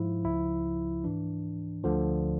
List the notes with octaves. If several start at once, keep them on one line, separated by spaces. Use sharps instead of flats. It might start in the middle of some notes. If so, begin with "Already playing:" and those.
Already playing: G#2 F3 E4
C#2 C#3 F3 E4
G#2 E3 D4
D2 D3 F3